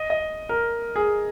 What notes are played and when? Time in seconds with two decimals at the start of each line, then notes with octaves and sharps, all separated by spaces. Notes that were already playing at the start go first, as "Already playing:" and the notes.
Already playing: D#5
0.10 D#5
0.49 A#4
0.96 G#4